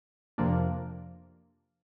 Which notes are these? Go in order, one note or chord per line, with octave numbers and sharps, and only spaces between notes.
F2 C3 F3 A#3 D4